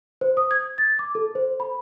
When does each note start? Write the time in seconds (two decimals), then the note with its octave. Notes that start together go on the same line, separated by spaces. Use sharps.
0.21 C5
0.37 D#6
0.51 G#6
0.78 A6
0.99 D6
1.15 A4
1.35 C5
1.60 B5